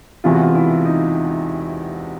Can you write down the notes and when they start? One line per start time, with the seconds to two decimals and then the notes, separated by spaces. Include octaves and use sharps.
0.24 E1 E2 C3 E3 F4
0.34 F#4
0.42 F4
0.55 E4
0.85 D#4